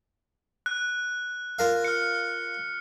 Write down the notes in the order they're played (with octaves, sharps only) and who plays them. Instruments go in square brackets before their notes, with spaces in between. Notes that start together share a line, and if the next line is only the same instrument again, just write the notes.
[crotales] F#6
[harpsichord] F4 A#4 F5
[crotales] F6 C#7